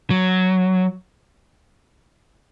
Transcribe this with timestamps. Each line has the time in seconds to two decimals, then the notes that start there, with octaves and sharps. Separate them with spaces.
0.10 F#3